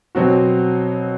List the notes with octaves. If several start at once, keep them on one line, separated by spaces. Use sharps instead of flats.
B2 F#3 C4 F#4